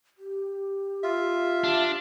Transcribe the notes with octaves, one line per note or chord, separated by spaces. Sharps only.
G4
F4 E5
D4